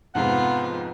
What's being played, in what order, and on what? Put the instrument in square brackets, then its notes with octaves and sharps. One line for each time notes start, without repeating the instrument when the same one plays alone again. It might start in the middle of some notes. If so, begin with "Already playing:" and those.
[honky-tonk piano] F2 G#2 C3 [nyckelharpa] B3 F4 [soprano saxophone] F#5